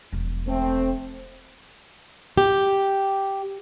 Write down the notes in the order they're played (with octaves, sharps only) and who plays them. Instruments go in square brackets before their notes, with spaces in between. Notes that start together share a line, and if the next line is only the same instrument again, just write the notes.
[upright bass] E1 F3
[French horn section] A3 C4
[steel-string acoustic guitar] G4